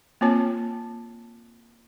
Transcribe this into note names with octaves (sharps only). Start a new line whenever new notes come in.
A#3 C4 F4 C#5 A5